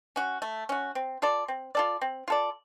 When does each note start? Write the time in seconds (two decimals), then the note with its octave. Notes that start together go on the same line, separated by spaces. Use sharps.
0.16 C#4 F#4
0.42 A3
0.69 C#4 F#4
0.95 C4
1.22 F4 A4 D5
1.48 C4
1.75 F4 A4 D5
2.01 C4
2.28 F4 A4 D5